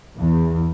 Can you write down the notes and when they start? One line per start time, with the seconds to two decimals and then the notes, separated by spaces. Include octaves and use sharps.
0.17 E2